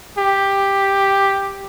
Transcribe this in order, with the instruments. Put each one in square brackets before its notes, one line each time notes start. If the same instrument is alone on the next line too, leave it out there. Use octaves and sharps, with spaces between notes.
[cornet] G4